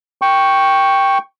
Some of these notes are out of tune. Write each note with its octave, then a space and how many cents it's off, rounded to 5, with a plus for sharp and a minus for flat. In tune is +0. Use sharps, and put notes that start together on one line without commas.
G5 +0 C#6 +0